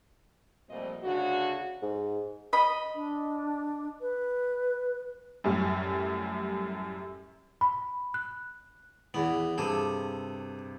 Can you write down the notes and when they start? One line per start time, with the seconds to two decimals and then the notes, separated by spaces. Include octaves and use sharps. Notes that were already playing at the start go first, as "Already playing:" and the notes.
0.69 A#2 F3 G3 A3 C4 D#5
1.04 D2 C#3 D4 F#4
1.82 G#2
2.53 D#5 B5
2.95 D4
4.01 B4
5.44 F#2 A2 G3
7.61 B5
8.14 F#6
9.14 E2 E3 B3
9.58 G2 C3 G#4 A4 D6